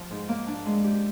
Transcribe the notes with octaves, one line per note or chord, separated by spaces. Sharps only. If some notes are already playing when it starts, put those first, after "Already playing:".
Already playing: F3
G#2
A#3
D4
G#3
G4